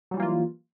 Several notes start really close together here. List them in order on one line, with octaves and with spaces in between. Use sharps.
F#3 G3 E3 A#3 F4